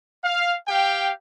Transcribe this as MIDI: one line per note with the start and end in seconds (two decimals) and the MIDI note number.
0.24 0.56 77
0.67 1.11 67
0.67 1.11 77
0.67 1.11 79